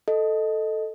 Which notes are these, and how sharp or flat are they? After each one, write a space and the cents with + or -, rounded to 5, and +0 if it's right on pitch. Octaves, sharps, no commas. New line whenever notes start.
A4 +0 D#5 +0